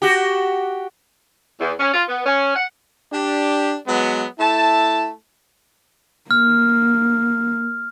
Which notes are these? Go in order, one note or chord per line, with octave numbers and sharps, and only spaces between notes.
F#4 G4
E2
C#4
F4
B3
C#4
F#5
D4 G4
F#3 G#3 B3
A3 E4 A5
A#3 F6